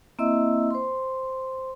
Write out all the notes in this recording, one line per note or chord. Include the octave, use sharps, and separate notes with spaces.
A#3 C4 E4 D#5 E5 E6
C5 C6